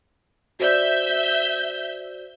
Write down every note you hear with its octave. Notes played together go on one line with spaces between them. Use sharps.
F#4 C5 D5 E5 G6